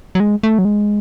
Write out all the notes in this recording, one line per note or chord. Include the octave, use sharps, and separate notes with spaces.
F#3
G#3
A3
F#3
G#3